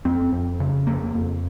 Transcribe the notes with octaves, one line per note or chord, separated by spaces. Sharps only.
F2 C4
F2
C#3
F2 A#3
F2